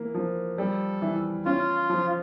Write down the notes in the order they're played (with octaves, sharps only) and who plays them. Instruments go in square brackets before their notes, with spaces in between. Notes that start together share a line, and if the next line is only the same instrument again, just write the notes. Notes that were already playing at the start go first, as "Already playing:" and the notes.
Already playing: [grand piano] E3 A#3
F3
[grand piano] G3 [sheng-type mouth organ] A4
[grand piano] E3
[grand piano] C#4 [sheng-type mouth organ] F4
[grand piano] F3